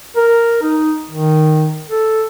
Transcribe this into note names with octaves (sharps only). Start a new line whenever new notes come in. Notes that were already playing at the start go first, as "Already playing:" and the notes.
A#4
D#4
D#3
A4